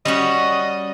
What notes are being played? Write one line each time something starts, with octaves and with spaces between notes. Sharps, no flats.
G3 C#4 F#4 D#5